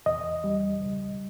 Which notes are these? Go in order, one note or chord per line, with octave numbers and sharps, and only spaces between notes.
E2 D#5
G3
C#2